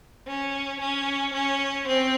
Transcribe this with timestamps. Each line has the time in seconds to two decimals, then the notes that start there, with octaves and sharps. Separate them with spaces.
0.27 C#4
0.80 C#4
1.33 C#4
1.87 C4